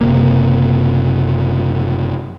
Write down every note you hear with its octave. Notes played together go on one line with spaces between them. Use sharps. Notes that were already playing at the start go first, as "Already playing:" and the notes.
F#1 C3 A#3